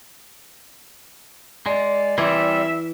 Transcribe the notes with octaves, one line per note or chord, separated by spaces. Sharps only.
G#3 D5
E3 G3 C4 G#4 E5